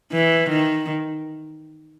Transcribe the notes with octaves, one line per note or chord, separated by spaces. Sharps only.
E3
D#3